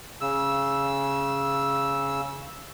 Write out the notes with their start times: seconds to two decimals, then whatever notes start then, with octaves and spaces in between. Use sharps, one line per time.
0.21 C#3 E6